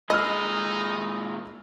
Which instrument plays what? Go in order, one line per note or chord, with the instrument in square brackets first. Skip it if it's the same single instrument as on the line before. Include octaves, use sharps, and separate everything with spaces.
[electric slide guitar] A#2 G#3 G#4 [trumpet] D#4 [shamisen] D#5 [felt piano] B5 E6 F6